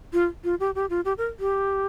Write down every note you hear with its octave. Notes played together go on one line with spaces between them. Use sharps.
F4
F4
G4
G4
F4
G4
A#4
G4